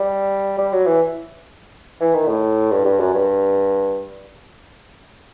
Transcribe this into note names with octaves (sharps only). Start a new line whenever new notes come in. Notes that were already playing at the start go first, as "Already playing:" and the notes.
Already playing: G3
G3
F#3
E3
E3
D#3
A2
G2
G2
F#2
G2